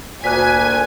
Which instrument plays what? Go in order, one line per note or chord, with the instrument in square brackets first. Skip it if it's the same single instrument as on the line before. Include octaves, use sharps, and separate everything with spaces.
[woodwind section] D2 A#2 [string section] G#5 [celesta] F#6 B6